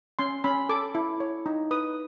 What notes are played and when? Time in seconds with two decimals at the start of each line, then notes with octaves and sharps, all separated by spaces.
0.19 C#4 C6
0.44 C#4 B5
0.69 A4 D6
0.95 E4
1.20 C#5
1.46 D#4
1.71 B4 D#6